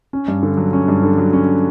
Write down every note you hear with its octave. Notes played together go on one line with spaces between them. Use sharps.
C#4
G2
D3
F#3
C#4
G2
D3
F#3
C#4